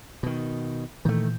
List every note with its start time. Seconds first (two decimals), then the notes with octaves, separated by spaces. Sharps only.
0.23 B2 D#3
1.05 A#2 D#3 E3 A3 G6